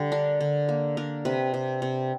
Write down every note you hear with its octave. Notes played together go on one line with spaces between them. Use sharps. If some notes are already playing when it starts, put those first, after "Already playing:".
Already playing: D3 G3
D4 A#4
D3
A#3
D4 A#4
C3 B4
C3
C3